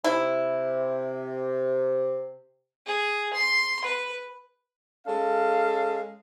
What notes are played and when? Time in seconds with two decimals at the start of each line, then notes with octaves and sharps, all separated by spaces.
0.04 C3 E4
2.86 G#4
3.34 C6
3.85 B4
5.07 G#3 C#4 A4 F5